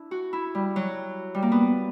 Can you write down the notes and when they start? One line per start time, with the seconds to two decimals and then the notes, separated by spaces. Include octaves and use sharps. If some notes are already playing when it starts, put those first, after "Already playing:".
Already playing: D4 E4
0.11 F#4
0.33 E4
0.55 G3
0.76 F#3
1.35 G3
1.42 A#3
1.52 B3